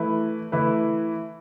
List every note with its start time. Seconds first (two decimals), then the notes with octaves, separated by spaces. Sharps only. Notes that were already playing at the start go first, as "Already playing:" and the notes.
Already playing: E3 A3 E4 B4
0.52 E3 A3 E4 B4